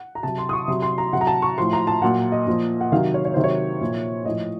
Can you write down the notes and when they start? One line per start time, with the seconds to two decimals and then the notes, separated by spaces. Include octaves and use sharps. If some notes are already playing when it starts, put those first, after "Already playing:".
Already playing: F#5
0.15 A#5
0.23 C3 F#3 A5
0.38 C6
0.49 D#6
0.53 C#6
0.68 C3 F#3 C6
0.82 C6
0.98 A#5
1.13 C3 F#3 F#5
1.21 A#5
1.27 A5
1.42 C#6
1.58 A2 F3 C6
1.73 A#5
1.87 A5
2.02 A#2 F#3 F#5
2.32 D#5
2.47 A#2 F3
2.81 F#5
2.92 C3 D#3 F#3 F5
3.14 C#5
3.25 C#5
3.34 C3 D#3 F#3 C5
3.44 C#5
3.81 A#2 F3
4.25 A2 F3 D#5